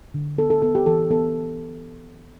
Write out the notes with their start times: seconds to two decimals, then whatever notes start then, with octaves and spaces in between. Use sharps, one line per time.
0.14 D3
0.38 B3 A4
0.50 A4
0.62 B3 A4
0.75 G4
0.86 E3 A4
1.11 B3 A4